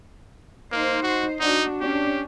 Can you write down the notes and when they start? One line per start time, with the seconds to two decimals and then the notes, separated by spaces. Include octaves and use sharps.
0.72 A#3 D#4 C5
1.03 F#4
1.40 D4 D#4 F#4
1.81 C#4 D4 G4